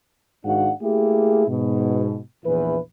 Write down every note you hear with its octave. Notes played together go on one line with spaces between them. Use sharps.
G#2 D#3 D4 F#4 F5 F#5
A3 A#3 E4 G4 G#4
G#2 B2
A#1 E2 E3 E4 B4